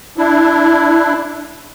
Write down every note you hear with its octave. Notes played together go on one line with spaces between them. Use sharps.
D4 E4